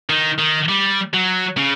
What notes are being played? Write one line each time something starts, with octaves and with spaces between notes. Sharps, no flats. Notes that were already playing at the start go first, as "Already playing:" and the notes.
D#3
D#3
G3
F#3
C#3